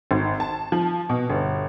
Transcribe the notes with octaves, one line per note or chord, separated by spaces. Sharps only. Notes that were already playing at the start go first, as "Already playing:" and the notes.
G#1
A5
F3
B2
G1